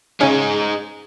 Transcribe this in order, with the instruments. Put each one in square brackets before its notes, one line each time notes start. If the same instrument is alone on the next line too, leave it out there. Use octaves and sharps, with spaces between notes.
[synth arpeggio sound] C#3 C#4 [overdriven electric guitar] G#3 D#4